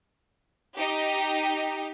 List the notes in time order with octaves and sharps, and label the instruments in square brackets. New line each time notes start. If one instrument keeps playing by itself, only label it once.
[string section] D#4 G4